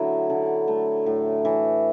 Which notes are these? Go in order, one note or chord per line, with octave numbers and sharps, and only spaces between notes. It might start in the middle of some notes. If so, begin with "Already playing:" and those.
Already playing: D3 F#3 A3 E4
D3
A3
A2
E3